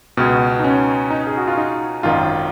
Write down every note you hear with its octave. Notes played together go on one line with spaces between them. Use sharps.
C#2 B2 B3
D#4
C#4
D#4
G#4
F#4
F4
D#4
G#1 F#2 D#3 F4